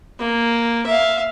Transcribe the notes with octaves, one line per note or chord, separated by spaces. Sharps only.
A#3
E5 F5